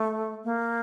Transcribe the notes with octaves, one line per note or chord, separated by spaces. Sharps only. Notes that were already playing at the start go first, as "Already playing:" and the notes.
Already playing: A3
A#3